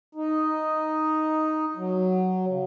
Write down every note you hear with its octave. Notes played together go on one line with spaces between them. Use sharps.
D#4
F#3
C#3